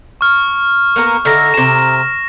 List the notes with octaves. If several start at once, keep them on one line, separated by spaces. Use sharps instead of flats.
C#6 F6
A#3 B3 A#4
D3 D#4 E4 F6 A#6
C3 A#5 E7